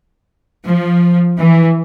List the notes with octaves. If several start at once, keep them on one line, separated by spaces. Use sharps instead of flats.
F3
E3